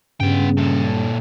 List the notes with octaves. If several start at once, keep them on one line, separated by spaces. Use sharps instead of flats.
G2 C#3 B3 G5
A#2 A4